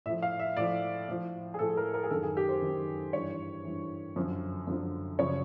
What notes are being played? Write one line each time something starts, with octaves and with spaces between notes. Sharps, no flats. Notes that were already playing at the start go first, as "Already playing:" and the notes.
A2 F3 E5
F5
E5
A2 F3 D5
A2 F3
G#4
A2 F3 A4
A#4
A#4
G#4
F#2 D#3 A4
G#4
G4
C5
F#2 D#3
G2 E3 C#5
G2 E3
F#2 D3 F3
F#2 D3 F3
F#2 C#3 F3 C#5